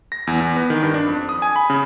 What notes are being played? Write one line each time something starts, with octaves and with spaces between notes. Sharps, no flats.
A#6
E2
E2
B3
D#3
G2
D4
F2
D#6
G#5
B5
C#3